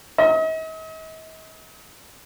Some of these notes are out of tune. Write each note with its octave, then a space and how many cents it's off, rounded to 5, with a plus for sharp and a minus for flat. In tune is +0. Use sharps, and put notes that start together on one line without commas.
D#5 +45